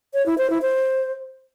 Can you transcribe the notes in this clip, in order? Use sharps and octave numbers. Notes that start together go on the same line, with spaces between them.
C#5
E4
C5
E4
C5